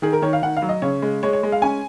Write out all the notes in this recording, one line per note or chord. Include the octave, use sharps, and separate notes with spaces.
D#3 G#4
A#4
D#3 C#5
F5
D#3 F#5
F5
F#3
D#5
C#3 C#5
G#3
G#3 C#5
C#5
G#3
F5
C#4 G#5